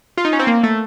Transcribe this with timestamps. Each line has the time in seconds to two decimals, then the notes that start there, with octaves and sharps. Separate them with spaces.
0.17 F4
0.25 D#4
0.33 C#4
0.39 C4
0.47 A#3
0.63 A3